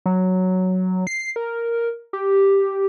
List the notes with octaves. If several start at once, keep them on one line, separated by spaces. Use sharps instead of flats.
F#3
C7
A#4
G4